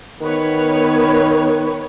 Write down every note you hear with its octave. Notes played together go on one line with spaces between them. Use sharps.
D#3 B3 B4 C#5